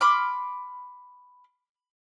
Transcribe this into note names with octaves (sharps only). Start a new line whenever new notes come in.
B5 C6 D6 F6